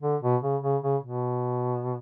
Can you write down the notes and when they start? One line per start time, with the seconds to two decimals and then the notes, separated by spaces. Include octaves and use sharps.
0.02 D3
0.22 B2
0.42 C#3
0.63 C#3
0.82 C#3
1.03 B2